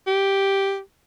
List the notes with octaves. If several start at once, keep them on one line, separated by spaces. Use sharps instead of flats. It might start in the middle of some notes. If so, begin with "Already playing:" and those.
G4